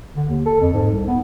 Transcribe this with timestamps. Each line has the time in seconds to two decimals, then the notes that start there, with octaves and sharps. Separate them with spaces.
0.16 D3
0.29 D#2
0.46 A4
0.60 F2
0.73 G#2
0.92 C2
1.08 B3